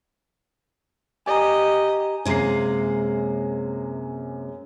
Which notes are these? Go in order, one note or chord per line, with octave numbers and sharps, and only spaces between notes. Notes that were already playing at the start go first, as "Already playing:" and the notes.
G4 D#5 G#5 A#5
F#2 C3 G#3 A#3 C7